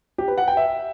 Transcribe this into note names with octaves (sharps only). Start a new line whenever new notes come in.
G4
B4
F#5
G5
E5